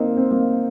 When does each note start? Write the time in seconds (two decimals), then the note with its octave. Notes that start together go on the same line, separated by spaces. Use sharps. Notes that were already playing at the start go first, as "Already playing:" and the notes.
Already playing: A#3 C4 D#4
0.17 C4
0.31 A#3